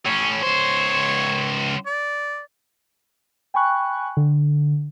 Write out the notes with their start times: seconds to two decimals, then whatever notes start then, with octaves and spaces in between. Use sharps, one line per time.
0.05 A2 C#4 C#5
0.42 C#2 C5 C#5
1.86 D5
3.54 G5 G#5 B5 C#6 F#6
4.17 D3